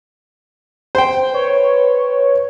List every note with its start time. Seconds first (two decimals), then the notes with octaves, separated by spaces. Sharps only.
0.95 C5 G5
1.34 B4 C#5